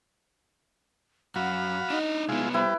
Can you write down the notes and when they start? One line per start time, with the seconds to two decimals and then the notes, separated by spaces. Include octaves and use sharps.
1.36 F#2 F#4 F5 F#5 B5
1.90 D4 D#4 D#5
2.29 C2 G#3 B3 E4 F4
2.54 G3 E4 B4 C5